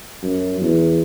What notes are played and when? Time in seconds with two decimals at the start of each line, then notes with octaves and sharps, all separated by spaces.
0.23 F#2
0.61 E2